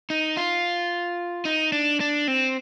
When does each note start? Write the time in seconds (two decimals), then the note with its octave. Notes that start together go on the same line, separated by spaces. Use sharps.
0.10 D#4
0.37 F4
1.45 D#4
1.72 D4
2.00 D4
2.28 C4